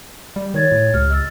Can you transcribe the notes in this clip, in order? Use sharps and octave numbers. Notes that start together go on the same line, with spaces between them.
G3
D#3 C#5 G#6 A6
A2
C#2 G4 F6
D#5 E6 A6